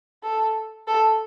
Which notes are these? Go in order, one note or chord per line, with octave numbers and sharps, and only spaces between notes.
A4
A4